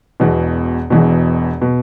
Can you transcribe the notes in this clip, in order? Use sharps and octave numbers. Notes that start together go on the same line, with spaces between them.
E1 E2 B2
E1 E2 B2
B2